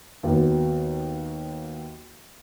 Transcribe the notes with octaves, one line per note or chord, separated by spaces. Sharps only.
D#2 B3 F#4